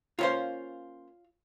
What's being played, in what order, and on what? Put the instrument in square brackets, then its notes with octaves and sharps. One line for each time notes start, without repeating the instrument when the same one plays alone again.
[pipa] A#3 C#4 C5 [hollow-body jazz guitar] F4 C#5 F5